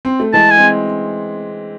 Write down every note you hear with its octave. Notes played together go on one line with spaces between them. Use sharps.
C4
A3
E3 G#3 A5
G#5
G#3 C4